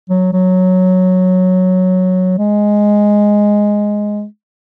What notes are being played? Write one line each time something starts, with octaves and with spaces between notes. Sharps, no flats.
F#3
F#3
G#3